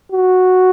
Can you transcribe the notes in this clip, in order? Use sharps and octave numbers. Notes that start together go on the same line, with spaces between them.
F#4